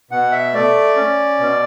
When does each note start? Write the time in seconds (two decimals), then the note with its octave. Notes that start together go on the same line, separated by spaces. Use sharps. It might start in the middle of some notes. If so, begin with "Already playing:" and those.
0.11 B2 F#5
0.32 E5
0.53 A3 D5
0.96 C#4
1.40 B2